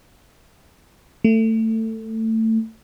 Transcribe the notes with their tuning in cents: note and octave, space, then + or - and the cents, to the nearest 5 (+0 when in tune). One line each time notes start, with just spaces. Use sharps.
A3 +20